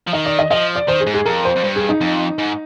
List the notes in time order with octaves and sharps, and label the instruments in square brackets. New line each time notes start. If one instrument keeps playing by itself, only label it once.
[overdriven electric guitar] F3
[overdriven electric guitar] D#3 [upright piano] D#5
[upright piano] D5
D#5
[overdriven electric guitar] F3 [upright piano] D#5
[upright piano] D5
[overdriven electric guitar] D#3 [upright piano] C5
[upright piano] G#4
[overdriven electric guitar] G#2
[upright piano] G#4
[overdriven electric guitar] F2 [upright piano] A#4
[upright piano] C5
[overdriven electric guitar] F2
G2
[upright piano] G#4
D#4
[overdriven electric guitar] F2
G#2